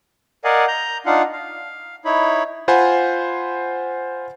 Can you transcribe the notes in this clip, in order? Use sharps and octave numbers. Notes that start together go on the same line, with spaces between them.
A#4 D5 D#5 F5 F#5 G#5
A#5 G6
D4 D#4 F4 F5 F#5
F5
D#4 E4 C#5 B5
F4 C5 F#5 G#5 B5 C6